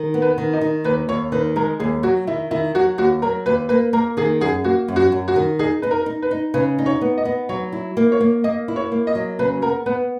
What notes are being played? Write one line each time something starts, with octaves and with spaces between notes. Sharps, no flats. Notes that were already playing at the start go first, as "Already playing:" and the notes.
Already playing: D#3
B3
B4
D#3
D#4
D#3
D#2 B4
D#2 C#5
D#3 B4
G#3 A#4
D#2 G#4
F#3 F#4
D#3 E4
D#3 E4
F#3 F#4
D#2 F#4
F#3 A#4
D#2 B4
A#3 B4
A#3 A#4
D#3 G#4
F#2 G#4
A#3 F#4
F#2
F#4
F#2
F#4
D#3
D#4 G#4
D#4 B4
A#4
D#4
B4
D#4
C#3 B4
D#4
C#5
B3
D#5
B3
F#3 C#5
E4
A#3
C#5
A#3
A#3 D#5
E4
C#5
A#3
D#5
F#3
C#3 B4
B3 A#4
B3 B4